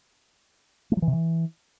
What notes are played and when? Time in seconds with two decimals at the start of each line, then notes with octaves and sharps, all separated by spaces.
0.92 A3
0.97 F#3
1.02 E3
1.07 C3
1.13 E3